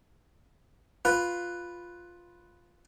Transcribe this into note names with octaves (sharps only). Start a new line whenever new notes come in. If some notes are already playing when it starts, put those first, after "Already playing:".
F4 B4